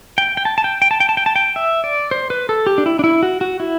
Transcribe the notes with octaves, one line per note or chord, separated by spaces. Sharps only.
G5
G5
A5
A5
G5
G5
A5
G5
A5
G5
A5
G5
E5
D5
C5
B4
A4
G4
D4
E4
D4
E4
F#4
F#4
E4